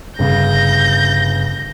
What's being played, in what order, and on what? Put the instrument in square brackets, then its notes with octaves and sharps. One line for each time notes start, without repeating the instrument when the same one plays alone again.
[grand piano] G1 C#3 [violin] G6 A#6